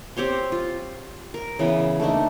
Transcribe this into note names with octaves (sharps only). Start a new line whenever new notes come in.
C4 G4 C#5 C6
F4
A#4
C#3 E3 B3 B4
A3 A#3 D4 D#4